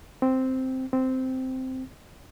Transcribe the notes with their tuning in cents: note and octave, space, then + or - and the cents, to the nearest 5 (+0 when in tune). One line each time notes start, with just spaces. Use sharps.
C4 -5
C4 -10